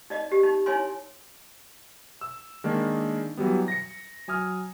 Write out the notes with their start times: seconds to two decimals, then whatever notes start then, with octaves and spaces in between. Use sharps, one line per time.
0.10 D#4 D5 D#5
0.31 G4
0.43 D#4
0.66 D#4 E4 C#5 G#5 C6
2.21 E6
2.64 D#3 G#3 A#3 D4
3.37 E3 F#3 G3 B3
3.68 A#6 C#7
4.28 F#3 G#5 D#6 F6